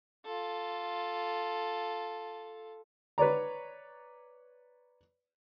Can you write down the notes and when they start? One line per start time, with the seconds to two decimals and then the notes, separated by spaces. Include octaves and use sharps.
0.25 F4 A4
3.18 B4 C#5 D5 A#5